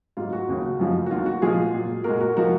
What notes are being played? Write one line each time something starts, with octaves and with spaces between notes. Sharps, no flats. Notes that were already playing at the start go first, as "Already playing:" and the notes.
G#2 F#3 F4
F#4
D#2 C#3 F#3
F#2 C#3 F3 G#3
F#4
D#2 D#3 F#3 F4
F#4
A#2 F3 G#3 F4 G#4
A#2 F#3
A#2 G#3 F#4 A#4
F#4 A#4
F3 G#3 F#4 A#4